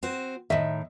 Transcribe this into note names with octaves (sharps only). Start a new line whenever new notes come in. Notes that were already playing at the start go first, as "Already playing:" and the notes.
C4 F#4 C5
A2 D#3 D#5 E5